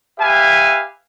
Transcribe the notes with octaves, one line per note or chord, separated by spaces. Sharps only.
G4 B4 E5 F5 G#5